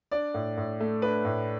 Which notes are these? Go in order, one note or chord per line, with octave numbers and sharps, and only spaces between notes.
D4 D5
A2
A2
A3
D4 B4
A2